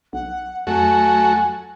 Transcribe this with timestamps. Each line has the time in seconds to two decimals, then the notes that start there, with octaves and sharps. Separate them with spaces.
0.13 B1 F#5
0.67 F2 F#3 A3 F#4 G#5